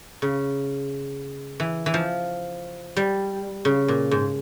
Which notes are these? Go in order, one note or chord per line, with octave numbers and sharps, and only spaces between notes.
C#3
E3
E3
F3
G3
C#3
A#2
G#2